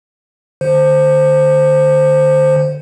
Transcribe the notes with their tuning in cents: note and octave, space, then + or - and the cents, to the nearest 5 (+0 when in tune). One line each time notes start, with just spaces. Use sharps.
D3 +25 C5 +0